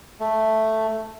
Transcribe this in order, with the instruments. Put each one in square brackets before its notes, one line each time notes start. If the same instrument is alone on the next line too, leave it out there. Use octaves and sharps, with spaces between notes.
[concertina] A3